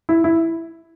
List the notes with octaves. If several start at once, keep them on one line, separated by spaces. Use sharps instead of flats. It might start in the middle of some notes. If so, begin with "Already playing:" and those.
E4
E4